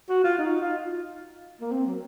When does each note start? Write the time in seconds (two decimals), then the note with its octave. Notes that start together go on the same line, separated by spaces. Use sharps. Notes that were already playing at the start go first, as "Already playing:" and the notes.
0.09 F#4
0.24 F4
0.38 D#4
0.60 F4
1.61 A#3
1.71 C4
1.86 F#3